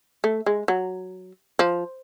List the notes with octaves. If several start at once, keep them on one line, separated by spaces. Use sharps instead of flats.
A3
G#3
F#3
F3